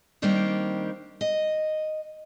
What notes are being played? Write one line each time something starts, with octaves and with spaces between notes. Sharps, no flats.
D#3 G3 A#3 C4 D4 G4
D#5